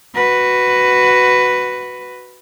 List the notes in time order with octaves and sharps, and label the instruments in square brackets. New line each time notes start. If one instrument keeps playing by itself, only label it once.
[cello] F#4 B4